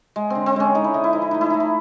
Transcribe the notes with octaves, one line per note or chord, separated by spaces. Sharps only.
G#3
D3 C4
C4
G#3 C#4
G#3 D#4
E4
D3 D#4
E4
F3 D#4
E4
A3 D#4
E4
A3 D#4
E4